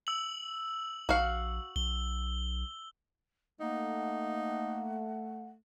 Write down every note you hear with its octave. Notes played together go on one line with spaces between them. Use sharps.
E6 F#7
A#1 F#4 F5
B1 G7
A3 A#3 D#4 F#5